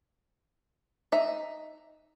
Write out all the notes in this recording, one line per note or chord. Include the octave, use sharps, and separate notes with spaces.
D#4 E5